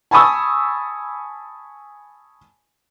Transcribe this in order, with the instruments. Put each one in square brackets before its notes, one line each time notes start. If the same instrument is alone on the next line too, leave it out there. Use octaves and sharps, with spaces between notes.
[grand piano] G#5 A5 B5 C#6 D#6 E6